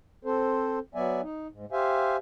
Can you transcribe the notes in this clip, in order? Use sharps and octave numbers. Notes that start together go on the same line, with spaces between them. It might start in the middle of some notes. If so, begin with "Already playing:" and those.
C4 A4 C5
F#3 B3 D5 E5 G#5
D#4
G#2
G4 C5 E5 F5 G#5